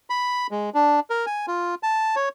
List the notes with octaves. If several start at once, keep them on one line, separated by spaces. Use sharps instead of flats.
B5
G#3
D4
A#4
G#5
F4
A5
C#5